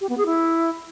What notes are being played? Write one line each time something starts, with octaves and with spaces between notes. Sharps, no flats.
G4
B3
G#4
E4